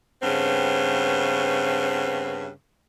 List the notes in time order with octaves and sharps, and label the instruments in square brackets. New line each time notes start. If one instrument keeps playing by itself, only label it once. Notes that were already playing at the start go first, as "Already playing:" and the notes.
[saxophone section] G2 C#3 B3 C4